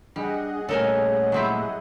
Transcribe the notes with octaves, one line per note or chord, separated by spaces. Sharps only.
G3 D4 G#4 D#5 F#5
A#2 G3 A3 C#4 A4 A#4 G#5
F#3 C4 E4